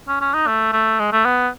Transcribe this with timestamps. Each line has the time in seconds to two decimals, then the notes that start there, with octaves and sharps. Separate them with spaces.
0.08 C#4
0.21 C#4
0.34 D#4
0.47 A3
0.73 A3
1.00 G#3
1.12 A3
1.25 B3